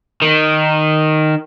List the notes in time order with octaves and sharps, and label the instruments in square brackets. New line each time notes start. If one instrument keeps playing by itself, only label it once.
[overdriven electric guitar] D#3